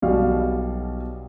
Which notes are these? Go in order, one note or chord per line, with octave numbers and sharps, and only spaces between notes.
B1 B2 G3 F5